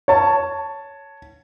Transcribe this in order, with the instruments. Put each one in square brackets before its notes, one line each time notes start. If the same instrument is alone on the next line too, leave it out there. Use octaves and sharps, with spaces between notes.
[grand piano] C#5 A5